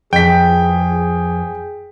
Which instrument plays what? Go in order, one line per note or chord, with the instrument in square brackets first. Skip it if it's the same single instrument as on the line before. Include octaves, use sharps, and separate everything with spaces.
[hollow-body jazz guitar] F2 [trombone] G#4 [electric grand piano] G5 B6